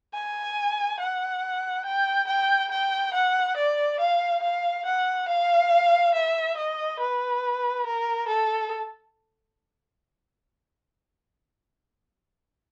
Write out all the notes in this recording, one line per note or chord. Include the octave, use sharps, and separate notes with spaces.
G#5
F#5
G5
G5
G5
F#5
D5
F5
F5
F#5
F5
E5
D#5
B4
A#4
A4